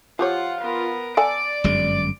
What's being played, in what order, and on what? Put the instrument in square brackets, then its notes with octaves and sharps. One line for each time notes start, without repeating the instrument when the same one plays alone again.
[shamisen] F3 G4 C#5 [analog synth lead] F4 [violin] F#5
[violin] B3 A#4
[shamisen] A4 F#5 G#5 [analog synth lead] D5 [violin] D7
[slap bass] G1 F#2 G#3 [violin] D7